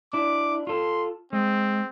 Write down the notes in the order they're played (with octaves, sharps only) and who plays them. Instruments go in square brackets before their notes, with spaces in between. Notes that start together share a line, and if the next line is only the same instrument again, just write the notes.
[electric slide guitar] D4 E4 [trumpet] D6
[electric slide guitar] F4 A4 [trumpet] C6
[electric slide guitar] G#3 [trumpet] C4